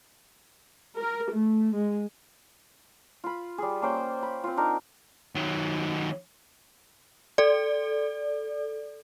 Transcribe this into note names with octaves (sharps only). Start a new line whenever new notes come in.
A#4
A3
G#3
F4 B5
G3 G#4
A#3 C#4 C5 G5
B5
C4 F4
D4 D#4 A#4
D#3 F#3
A4 D5